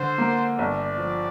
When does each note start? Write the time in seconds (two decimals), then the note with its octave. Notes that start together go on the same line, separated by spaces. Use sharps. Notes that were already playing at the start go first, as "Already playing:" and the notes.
Already playing: D3 C5
0.18 A#3
0.59 G1 D5
0.98 F3